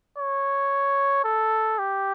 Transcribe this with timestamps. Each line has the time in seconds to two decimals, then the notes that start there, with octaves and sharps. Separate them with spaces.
0.18 C#5
1.24 A4
1.79 G4